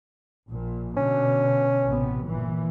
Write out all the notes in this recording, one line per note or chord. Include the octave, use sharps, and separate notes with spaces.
A#1 A#2
B2 D3 C#4
A1 C3 B3
G1 A#2 E3